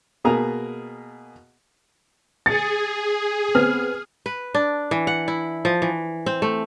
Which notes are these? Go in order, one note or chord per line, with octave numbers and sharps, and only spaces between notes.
B2 A#3 B3 G#4 A#5
G#4 A6 C#7
B3 C4 F6
B4
D4
E3
F#5
E4
F3
E3
C4
A3